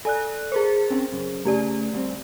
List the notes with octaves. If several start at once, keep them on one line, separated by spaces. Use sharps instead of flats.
A4 D5 G#5 F#6
G#4 A#4 C5
C4 C#4 G5
F#2 C#3
C#3 A3 G4 D5
D2 G3 C4